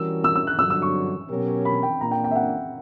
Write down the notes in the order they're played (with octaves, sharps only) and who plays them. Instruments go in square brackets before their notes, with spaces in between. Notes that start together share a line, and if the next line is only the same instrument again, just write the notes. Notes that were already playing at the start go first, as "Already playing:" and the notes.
Already playing: [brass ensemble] E3 G3 C#4 F#4 A#4 [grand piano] E6
[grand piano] E6
E6
F#6
[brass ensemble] G2 D3 F#3 [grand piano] E6
[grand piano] E6
C#6
[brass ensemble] B2 F#3 C#4 G4 A#4
[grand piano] B5
G5
[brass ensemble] A#2 A#3 D4 [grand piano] A#5
[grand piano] G5
G5
E5
F#5